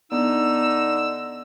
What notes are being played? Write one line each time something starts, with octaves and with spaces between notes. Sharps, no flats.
D3 B3 D4 D#4 E6